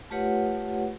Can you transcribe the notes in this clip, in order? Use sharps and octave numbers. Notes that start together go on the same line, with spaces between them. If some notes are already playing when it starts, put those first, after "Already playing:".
A3 F4 G4 B4 C#5 F#5